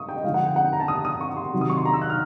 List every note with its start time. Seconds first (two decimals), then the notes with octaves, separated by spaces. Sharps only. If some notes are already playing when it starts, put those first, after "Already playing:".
Already playing: C#6 D#6
0.09 G5
0.16 D#5
0.24 D3 F3 G#3 F5
0.34 F#5
0.46 G5
0.56 F#5
0.64 G5
0.73 A#5
0.80 A5
0.88 D#6
1.05 D#6
1.21 C#6
1.37 C6
1.53 C3 D#3 F#3
1.61 D#6
1.70 C#6
1.77 C6
1.85 A#5
1.93 E6
2.02 F#6
2.10 F6